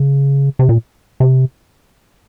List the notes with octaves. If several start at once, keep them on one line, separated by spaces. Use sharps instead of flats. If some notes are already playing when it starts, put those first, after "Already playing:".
Already playing: C#3
C3
A#2
C3